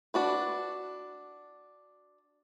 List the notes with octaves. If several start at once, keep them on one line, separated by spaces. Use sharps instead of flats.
D4 F#4 B4